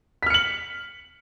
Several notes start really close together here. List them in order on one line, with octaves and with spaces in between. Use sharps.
B6 F6 C#7 F#7